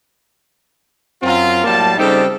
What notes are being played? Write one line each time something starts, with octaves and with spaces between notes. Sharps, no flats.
F#2 C4 F4
A2 F#3 G3 A#3 A5
C#3 G3 C4 D#4 G4 A4